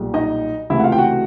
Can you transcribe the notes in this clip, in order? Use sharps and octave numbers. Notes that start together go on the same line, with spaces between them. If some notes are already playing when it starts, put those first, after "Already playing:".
Already playing: B1 A#2 G3
D#4 D#5
C#2 C3 E3 A3 E4 E5
F#5
F4 F5
G5
F#4 F#5